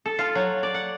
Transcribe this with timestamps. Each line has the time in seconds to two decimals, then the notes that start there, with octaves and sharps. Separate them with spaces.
0.06 A4
0.19 F4
0.35 F#3
0.63 D5
0.74 F#5